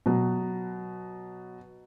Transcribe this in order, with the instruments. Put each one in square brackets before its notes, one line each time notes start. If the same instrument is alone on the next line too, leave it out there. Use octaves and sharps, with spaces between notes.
[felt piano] B2 F#3